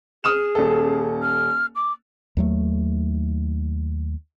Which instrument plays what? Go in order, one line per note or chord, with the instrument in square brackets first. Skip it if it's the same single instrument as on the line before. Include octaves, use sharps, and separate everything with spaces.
[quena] G#4 [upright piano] D#6 F6 E7
[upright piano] D#1 A4
[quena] F6
D6
[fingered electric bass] D#2 F#3 A3